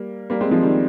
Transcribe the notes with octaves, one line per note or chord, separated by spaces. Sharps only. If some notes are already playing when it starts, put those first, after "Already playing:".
Already playing: G3 A#3
G3 A#3
G#3 C4
F3 G#3
D#3 G3